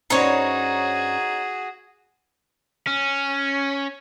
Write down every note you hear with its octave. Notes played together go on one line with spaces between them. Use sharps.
G2 C#4 D#4 F#4 G#4 C5 C#5
C#4